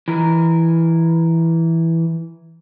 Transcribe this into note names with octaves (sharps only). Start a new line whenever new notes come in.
E3 A#4